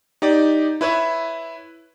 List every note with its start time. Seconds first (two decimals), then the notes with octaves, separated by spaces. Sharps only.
0.22 D#4 G4 D5
0.81 E4 B4 C#5 E5